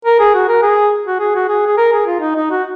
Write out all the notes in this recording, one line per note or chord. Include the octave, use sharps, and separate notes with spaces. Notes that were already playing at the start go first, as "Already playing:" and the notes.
A#4
G#4
F#4
A#4
G#4
F#4
G#4
F#4
G#4
G#4
A#4
G#4
F4
D#4
D#4
F#4